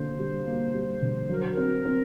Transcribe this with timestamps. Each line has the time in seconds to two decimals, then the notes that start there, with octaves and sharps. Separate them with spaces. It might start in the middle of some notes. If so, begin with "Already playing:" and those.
Already playing: D3 A#3 C5
0.19 G3
0.46 A#3
0.74 G3
1.02 D3
1.29 F#3 A#4
1.40 C5
1.50 A#4
1.57 C4
1.85 C4